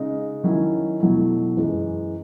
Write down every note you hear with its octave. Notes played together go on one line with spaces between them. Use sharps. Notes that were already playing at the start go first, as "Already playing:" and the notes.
Already playing: C#3 G#3 D#4
D#3 F#3 C#4 E4
B2 F#3 A3 E4
F#2 E3 G#3